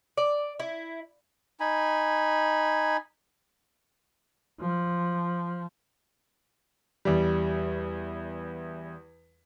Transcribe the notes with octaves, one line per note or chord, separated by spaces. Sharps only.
D5
E4
D#4 G#5 B5
F3
E2 G3